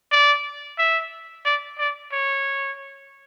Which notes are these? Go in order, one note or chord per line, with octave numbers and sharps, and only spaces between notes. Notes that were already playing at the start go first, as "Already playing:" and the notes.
D5
E5
D5
D5
C#5